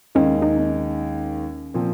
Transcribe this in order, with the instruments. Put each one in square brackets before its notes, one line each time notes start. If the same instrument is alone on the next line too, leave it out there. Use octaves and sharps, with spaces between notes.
[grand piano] D#2 D#3 G#3 [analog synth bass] C#4
[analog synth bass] D#4
C4
C#4
[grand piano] A#2 F3 C4